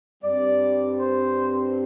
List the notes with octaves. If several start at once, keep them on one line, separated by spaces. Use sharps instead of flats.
G2 G3 C4 D5
C5